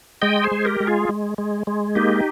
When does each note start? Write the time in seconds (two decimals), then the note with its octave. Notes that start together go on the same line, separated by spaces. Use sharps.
0.22 G#3 D#5 G5
0.44 G#4 C5
0.51 G#3
0.65 G4 A#4
0.80 G#3
0.87 F4 G#4
1.09 G#3
1.38 G#3
1.67 G#3
1.95 A#3 D#4 G4